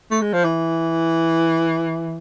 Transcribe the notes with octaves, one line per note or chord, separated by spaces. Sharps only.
A3
G#3
F3
E3